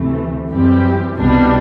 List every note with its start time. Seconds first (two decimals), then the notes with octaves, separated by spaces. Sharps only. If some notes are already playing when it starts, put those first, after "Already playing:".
Already playing: D2 C3 E3 A3
0.49 F#2 E3 G3 C4 G4
1.16 C2 B2 G3 D4